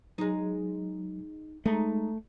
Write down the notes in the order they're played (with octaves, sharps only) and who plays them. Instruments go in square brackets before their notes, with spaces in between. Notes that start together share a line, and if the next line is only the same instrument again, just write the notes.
[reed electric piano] F#3 [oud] G#3 D#4
[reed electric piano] G#3 [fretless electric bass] A3 [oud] D#4